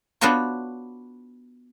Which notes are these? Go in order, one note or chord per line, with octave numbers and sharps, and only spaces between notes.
B3 D4 F4 F#4 C5 C#5